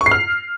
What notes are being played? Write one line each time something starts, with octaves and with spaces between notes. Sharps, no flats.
C#6
C7
F6